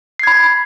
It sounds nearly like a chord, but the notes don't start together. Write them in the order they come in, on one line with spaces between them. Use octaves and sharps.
C7 G#6 B5